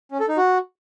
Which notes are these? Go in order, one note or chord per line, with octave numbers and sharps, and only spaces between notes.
C#4
A4
D#4
F#4